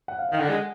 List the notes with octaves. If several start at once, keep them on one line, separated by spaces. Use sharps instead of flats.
F#5
F5
F5
D#3
D3 F#5
G#3